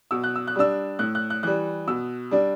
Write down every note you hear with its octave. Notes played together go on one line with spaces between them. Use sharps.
B2 E6
F#6
E6
F#6
G3 D4 E6
A2 F#6
F#6
F#6
E3 G3 F#6
B2 E6
G3 D4